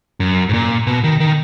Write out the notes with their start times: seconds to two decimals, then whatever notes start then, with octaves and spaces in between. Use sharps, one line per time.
0.20 F#2
0.49 G#2
0.53 A#2
0.87 B2
1.04 D#3
1.20 D#3